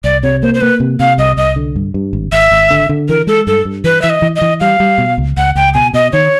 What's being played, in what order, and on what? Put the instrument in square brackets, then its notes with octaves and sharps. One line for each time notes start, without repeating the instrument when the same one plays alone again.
[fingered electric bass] C2 [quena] D5
[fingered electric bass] C3 [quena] C#5
[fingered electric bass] A#3 [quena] C5
[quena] C5
[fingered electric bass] A#3 [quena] B4
[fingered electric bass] C3
[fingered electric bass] C3 [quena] F5
[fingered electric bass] C2 [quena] D#5
[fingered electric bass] C2 [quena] D#5
[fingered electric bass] D3
G2
G2
G#1
[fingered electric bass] G#1 [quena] E5
[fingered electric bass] G#1
D3
D3
[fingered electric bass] E3 [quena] A#4
[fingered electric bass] G#3 [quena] A4
[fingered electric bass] G2 [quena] A4
[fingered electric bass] G2
[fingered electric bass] E3 [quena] B4
[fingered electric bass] E3 [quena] E5
[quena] D#5
[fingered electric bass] E3
[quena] D#5
[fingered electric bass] E3
[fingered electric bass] G3 [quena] F5
[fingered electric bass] G3
B2
C#2
[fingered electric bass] C#2 [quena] F#5
[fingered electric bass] C#2 [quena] G5
[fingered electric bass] B2 [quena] G#5
[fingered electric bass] B2 [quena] D#5
[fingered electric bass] D#3 [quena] C#5